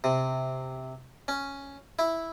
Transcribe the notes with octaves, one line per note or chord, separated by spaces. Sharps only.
C3
C#4
E4